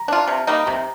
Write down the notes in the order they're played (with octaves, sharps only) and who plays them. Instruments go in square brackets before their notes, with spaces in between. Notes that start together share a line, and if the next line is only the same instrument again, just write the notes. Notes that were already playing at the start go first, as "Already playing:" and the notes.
Already playing: [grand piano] A#5
[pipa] D4 F4
C3
G3 A#3 D#4
[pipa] C3 [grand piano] A#5